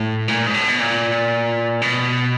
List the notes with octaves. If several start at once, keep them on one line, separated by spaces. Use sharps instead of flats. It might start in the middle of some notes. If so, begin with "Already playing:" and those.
Already playing: A2
A#2
G#2
A2
B2
A#2
B2